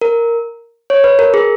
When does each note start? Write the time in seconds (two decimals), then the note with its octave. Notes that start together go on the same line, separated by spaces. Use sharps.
0.01 A#4
0.90 C#5
1.04 B4
1.19 A#4
1.34 G#4